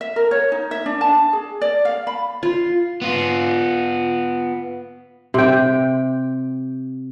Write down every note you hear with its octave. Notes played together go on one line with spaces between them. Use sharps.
E5
A#4
C#5
D#4
E5
D4
A5
G#4
D5
F5
B5
F4
B3 F4
C3 G5